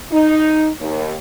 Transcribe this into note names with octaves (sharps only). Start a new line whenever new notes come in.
D#4
D#2